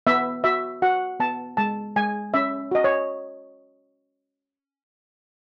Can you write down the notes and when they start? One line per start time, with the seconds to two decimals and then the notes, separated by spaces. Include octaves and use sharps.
0.07 B3 E5
0.44 F#4 E5
0.82 F#4 F#5
1.20 B3 A5
1.57 G#3 A5
1.96 G#3 G#5
2.34 C#4 E5
2.71 F#4 D#5
2.84 C#5